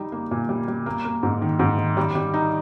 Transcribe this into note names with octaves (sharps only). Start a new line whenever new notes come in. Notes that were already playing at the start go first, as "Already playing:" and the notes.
Already playing: G3 D#4
A#3
A#2
G3
G3
A#3
A#3
G#2
D#3
G#2
D#3
G3
G3
D#4